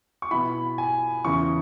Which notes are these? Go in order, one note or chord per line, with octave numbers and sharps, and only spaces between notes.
C#6
B2 B3 E4 B5
G#5
E2 C#3 E3 C#4 E4 C#6